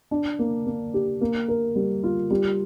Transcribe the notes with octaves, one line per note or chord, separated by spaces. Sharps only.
D4
A#3
A#3
G4
A#3
A#4
G3
F4
G3